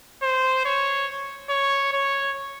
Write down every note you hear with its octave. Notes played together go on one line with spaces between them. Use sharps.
C5
C#5
C#5
C#5